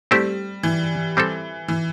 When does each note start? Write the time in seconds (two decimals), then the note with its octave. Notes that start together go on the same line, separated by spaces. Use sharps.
0.11 G3 A3 C4 E4 G4 C5
0.63 E3
1.17 G3 C4 A4
1.68 E3